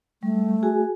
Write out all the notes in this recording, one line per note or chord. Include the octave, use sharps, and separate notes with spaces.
G3 A3
F#4 G#4 G#5